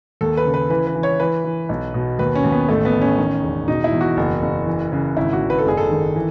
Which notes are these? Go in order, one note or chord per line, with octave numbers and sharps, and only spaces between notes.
D#2 A4
B4
C#3
B4
E3 B4
B4
E3
C#5
E3 B4
E3
B1
B2
D#2 B4
C#4
D#2
B3
A1 A3
B3
A1
C#4
D#3
E1
B2 D#4
E4
E2
F#4
F#1
F#1
E3
C#3
G#1 E4
F#4
G#1
B4
A4
F#1 G#4
A4
D#3
E3